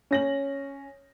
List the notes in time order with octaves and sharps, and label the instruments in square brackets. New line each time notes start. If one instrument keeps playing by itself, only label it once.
[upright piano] C#4 A#6 F#7